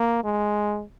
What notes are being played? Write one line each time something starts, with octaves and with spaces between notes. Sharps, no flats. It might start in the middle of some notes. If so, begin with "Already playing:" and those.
Already playing: A#3
G#3